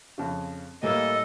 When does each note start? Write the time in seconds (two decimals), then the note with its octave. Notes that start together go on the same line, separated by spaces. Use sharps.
0.18 F2 C#3
0.83 A2 G3 A#3 A4 D#5 G#5